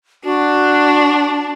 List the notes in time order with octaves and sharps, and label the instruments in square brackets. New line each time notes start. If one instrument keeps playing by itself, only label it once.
[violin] D4 [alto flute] F#4